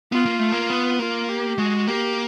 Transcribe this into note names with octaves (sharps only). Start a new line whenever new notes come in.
B3 F4
A#3
A3
A#3
B3
A#3 F4
G4
G#3 F#4
A#3 G4